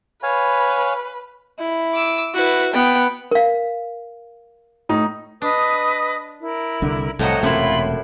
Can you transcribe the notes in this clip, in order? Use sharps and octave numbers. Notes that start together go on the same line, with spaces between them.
B4 C#5 F5 G#5
E4
D6 E6
E4 F#4 B4
B3 G5
A#4 F5
A2 D#4
D4 B4 D#5 D#6
E4 A#4
C2 D3
C2 A2 F3 F#3 D#5 F#5
E1 F#2 C3 A3 E4 F4 B5